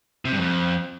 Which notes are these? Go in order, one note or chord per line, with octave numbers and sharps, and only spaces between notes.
C3
G2
F2